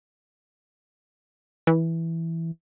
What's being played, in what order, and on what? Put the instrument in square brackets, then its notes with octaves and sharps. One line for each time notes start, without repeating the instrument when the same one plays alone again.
[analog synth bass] E3